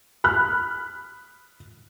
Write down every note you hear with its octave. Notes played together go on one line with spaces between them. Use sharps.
B5 F6 F#6